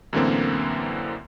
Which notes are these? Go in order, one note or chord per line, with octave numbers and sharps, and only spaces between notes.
F#2 A2 D3 E3 A#3 C4